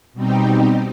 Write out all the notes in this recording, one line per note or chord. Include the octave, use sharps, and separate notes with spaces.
B2 G3 C4 D#4 G4